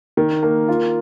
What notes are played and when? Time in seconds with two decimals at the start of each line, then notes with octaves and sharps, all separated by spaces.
0.17 D#3
0.43 A#3
0.69 F4